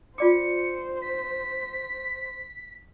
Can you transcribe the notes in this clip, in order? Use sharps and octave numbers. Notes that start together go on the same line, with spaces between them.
F4 C5 D5 D6 C#7
B6